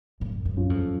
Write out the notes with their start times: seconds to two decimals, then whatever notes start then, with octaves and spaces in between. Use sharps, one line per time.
0.20 F#2 A2
0.45 F#2
0.57 F#3 C#4 F4
0.70 F2